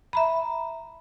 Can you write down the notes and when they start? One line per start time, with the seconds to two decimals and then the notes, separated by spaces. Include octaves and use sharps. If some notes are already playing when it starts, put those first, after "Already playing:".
0.13 E5 A#5 B5